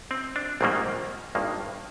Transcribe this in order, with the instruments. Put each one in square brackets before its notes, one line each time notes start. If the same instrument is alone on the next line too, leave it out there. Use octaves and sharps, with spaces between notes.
[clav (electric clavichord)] C4
D4
A#1 G#2 D#3 G3 A#3 C4
G#1 G2 D#3 A#3